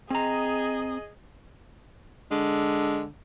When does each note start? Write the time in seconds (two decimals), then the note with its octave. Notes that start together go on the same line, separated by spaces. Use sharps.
0.10 C4 G#4 D#5 A#5
2.31 D3 G#3